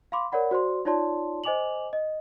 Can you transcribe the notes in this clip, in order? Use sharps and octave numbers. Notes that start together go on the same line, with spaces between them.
F5 B5 C6 D6
A#4 C#5 D5 F#5 B5
F#4 C5 D5 C6
D#4 F4 C#5 D5 A5 C6
C5 D#5 G#5 D6 F7 F#7
D#5